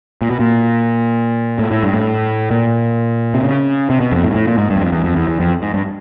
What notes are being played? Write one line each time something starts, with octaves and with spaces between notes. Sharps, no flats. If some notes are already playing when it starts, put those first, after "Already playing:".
A#2
B2
A#2
A2
A2
G2
A2
A#2
C3
C#3
C3
B2
F2
A2
G#2
A2
A#2
G#2
G2
E2
F2
E2
F2
E2
E2
F2
G#2
G2